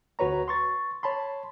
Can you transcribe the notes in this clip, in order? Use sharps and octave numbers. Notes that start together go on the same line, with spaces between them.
D2 F#4 B4 C#5 A#5
C6 C#6 A6
C#5 A5 B5 C6